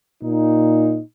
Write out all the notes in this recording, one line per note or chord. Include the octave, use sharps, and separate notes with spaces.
A#2 D#4